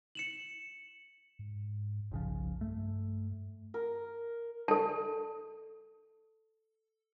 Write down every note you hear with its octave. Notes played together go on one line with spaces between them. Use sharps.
C#7 E7 F#7
G#2
F1 B1 C#3 F3
G2 A3
A#4
A4 A5